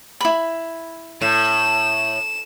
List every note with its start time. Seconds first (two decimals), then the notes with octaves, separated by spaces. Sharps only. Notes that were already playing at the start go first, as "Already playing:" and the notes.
0.21 E4 B5
1.21 A2 E7